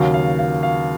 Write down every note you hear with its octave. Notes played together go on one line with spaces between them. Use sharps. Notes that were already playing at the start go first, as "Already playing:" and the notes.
Already playing: D#2 C#3 F#3 F5
F5
F5
F5